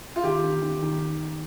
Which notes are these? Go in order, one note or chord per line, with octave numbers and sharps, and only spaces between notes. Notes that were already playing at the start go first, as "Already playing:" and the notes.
F4
D#3 G4
D#3
D#3
D#3